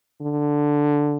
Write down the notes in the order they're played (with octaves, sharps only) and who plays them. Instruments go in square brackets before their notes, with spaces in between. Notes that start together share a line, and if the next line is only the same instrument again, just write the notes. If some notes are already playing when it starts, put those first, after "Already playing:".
[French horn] D3